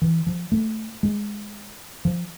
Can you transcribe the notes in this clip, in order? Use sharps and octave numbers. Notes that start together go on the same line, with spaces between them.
E3
F3
A3
G#3
F3